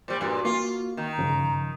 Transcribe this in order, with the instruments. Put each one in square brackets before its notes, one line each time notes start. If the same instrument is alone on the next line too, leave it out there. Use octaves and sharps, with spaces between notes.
[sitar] A#2 G3 [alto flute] C5
[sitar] G2 A#2 [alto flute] F#4
[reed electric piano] A#3 [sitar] F4
[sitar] D#3 [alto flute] A#5
[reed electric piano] G2 C#3 F3